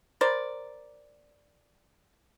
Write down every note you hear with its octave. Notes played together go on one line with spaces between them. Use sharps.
A#4 C5 D5